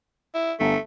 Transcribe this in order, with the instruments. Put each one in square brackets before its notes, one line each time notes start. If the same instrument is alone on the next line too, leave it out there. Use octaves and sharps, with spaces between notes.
[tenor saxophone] E4
[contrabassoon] G1 [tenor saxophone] A3